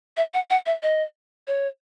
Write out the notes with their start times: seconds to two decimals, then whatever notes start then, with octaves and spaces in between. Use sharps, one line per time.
0.17 E5
0.34 F#5
0.50 F#5
0.66 E5
0.82 D#5
1.47 C#5